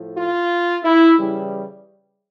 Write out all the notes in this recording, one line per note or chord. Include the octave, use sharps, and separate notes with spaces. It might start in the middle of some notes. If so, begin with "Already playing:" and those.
Already playing: A2 F3 A3
F4
E4
C#3 E3 G3